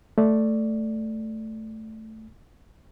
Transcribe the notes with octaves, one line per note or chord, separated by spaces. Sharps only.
A3 D5